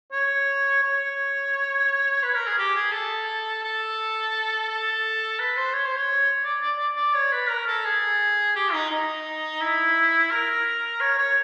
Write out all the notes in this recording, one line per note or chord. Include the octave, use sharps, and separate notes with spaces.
C#5
C#5
B4
A#4
G#4
G4
G#4
A4
A4
A4
B4
C5
C#5
C5
C#5
D5
D5
D5
D5
C#5
B4
A#4
A4
G#4
G4
D#4
D#4
E4
A#4
C#5
C#5